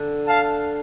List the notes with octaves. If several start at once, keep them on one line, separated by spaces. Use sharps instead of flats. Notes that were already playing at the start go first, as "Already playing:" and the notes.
Already playing: D3
F5 A5